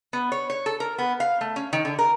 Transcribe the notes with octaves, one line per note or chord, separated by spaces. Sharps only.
B3
C#5
C#5
A4
A#4
B3
F5
A3
C#4
D#3
D3
A#4